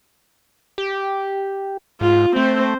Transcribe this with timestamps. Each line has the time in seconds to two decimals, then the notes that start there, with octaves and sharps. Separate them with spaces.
0.78 G4
2.01 G#2 F4
2.36 A3 C4 C5